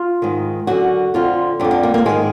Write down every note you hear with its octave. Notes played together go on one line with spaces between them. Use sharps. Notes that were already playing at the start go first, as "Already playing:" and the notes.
Already playing: F4
G#2 D#3
F#2 D3 F#4
F2 D3 F4
F2 D3 D4
D4
A#3
A#3
G#2 D#3 G#3